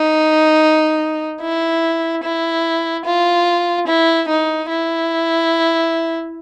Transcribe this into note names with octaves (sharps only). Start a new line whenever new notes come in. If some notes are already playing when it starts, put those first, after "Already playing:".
Already playing: D#4
E4
E4
F4
E4
D#4
E4